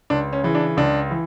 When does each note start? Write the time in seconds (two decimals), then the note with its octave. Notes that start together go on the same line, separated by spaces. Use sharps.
0.10 C#2 D4
0.33 C#4
0.43 C#3 E3
0.55 D4
0.77 C#2 D4
1.11 E3